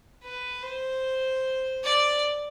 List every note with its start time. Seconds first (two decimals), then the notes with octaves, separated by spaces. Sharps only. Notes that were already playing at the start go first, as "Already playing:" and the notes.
0.23 B4
0.62 C5
1.83 D5